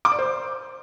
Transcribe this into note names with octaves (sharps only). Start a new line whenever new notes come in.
D6
D5
C5